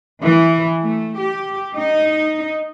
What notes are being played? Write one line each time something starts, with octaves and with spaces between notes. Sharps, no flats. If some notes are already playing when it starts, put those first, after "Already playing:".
E3
A3
G4
D#4